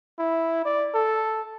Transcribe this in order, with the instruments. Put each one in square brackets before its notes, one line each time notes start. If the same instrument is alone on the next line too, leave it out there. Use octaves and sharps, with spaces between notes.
[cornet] E4
D5
A4